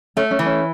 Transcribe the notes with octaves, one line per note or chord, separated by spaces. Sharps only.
A3 C#4
C#4
E3
C#4